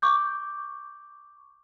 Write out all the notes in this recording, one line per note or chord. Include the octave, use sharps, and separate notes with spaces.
C#6 D6 G6